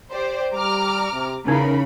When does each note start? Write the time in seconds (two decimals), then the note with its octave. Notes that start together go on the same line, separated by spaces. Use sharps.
0.12 G4 C5 D5
0.53 G3 A#5 D6 F6
1.13 C3
1.48 E2 C#3 D#4 E4 A#4 B5